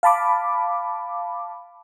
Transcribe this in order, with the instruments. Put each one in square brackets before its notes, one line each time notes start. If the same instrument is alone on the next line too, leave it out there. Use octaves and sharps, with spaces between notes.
[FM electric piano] F5 A5 B5 D6